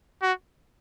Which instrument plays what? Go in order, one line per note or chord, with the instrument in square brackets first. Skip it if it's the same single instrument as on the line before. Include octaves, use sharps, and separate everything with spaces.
[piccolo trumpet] F#4